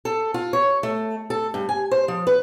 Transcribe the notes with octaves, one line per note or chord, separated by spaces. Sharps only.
A4
F4
C#5
A3
A4
G2
G#5
C5
F3
B4